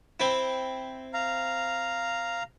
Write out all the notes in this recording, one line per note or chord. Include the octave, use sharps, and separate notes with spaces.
C4 E4
F5 A#5